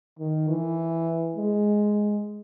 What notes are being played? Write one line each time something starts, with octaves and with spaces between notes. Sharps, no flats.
D#3
E3
G#3